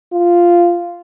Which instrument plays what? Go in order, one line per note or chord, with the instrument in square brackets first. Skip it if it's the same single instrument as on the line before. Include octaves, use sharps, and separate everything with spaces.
[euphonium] F4